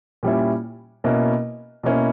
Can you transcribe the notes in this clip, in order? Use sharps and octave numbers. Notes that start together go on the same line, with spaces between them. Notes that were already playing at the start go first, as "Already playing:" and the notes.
A#2 G3 C#4 E4
B2 A#3 C#4 E4
B2 A#3 C#4 E4